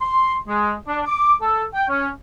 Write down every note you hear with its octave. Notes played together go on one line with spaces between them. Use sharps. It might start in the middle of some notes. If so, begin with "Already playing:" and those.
C6
G#3
D4
D6
A4
G5
C#4